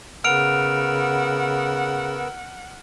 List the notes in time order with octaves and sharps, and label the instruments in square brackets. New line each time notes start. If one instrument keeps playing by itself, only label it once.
[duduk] C#3 [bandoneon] B3 A#4 E6 [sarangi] F#5 [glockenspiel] F6 D7 F7